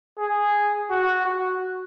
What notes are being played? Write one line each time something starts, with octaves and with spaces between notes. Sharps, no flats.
G#4
F#4
F#4